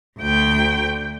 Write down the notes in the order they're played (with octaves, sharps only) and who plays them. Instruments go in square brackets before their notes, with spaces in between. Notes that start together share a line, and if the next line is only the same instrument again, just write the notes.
[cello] D2 G5